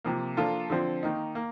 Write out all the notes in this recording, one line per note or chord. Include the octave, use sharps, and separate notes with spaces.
C3 F3 A#3
F3 A#3 D4 F4 A4
D3 F3 C4
D#3 A#3 D#4
A#3